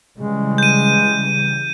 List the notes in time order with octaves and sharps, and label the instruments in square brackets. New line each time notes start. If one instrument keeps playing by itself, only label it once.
[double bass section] C#3 E3 G3 [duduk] G#3
[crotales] G6 D#7